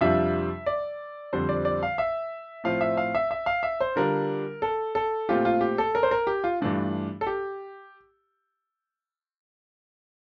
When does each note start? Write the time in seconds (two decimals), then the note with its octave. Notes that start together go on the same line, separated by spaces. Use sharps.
0.01 F2 C3 G3 D4 F4 E5
0.66 D5
1.33 F2 D3 G3 C4 C5
1.49 D5
1.65 D5
1.83 F5
1.98 E5
2.64 A2 F3 C4 F4 F5
2.81 E5
2.97 F5
3.15 E5
3.31 E5
3.46 F5
3.63 E5
3.80 C5
3.96 D3 G3 D4 F4 A#4
4.62 A4
4.95 A4
5.29 A#2 A3 C4 F4 G4
5.45 F4
5.61 G4
5.78 A4
5.95 A#4
6.03 C5
6.11 A#4
6.27 G4
6.44 F4
6.61 G2 E3 A3 D4 F4
7.21 A4
7.27 G4